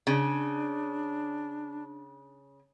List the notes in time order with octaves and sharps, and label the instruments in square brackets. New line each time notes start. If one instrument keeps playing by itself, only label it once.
[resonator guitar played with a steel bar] C#3 [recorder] D4